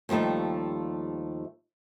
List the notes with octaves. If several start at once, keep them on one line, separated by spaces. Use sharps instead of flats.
D#2 F3 G3 A3 D#4